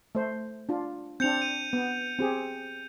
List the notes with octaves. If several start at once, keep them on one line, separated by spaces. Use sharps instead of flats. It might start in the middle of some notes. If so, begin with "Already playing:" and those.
A3 C5
D4 F4
C4 D4 G6 C#7 F7
D#7
B3
C4 G4 G#4